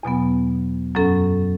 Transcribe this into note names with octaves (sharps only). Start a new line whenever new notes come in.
E2 B2 F#3 B3
F#2 F#3 C#4 A4